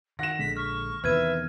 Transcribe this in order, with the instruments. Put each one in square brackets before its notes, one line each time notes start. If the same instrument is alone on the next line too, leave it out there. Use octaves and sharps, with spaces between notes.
[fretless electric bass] D#3 [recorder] F#5 [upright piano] A#6 E7
[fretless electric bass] A#1 D3 G#3 [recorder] B6
[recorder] C#6 [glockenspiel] F6
[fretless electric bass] E2 C3 D#3 [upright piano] B4 [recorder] E5 [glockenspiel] F6 G#6 D#7